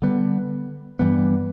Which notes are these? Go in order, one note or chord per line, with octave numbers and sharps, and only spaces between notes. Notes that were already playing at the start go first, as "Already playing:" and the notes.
D3 G3 B3
G2 E3 G3 B3